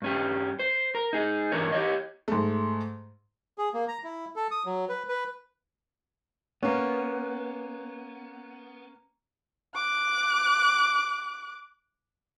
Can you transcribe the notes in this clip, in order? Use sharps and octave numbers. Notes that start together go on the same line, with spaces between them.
G2 C#4 G4
C5
A#4
D#4 G#4
G2 E3 D4 A#4 C#5
G4 C#5 D#5
G#2 A3
G#4
A#3
A#5
E4
A4
D#6
F#3
B4
B4
A#3 B3 C#4
D6 F#6